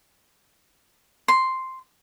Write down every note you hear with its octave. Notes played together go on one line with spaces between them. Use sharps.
C6